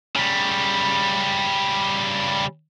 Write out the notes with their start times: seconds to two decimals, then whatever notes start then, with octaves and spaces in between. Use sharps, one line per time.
0.16 C#3 G3